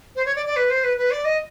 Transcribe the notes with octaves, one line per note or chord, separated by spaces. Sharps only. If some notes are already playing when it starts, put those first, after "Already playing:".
C5
C#5
D5
D5
B4
C5
B4
B4
D5
D#5